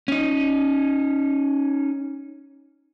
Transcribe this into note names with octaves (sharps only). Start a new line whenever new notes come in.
C#4 D#4